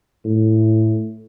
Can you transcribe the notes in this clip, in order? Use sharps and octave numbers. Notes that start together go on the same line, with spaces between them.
A2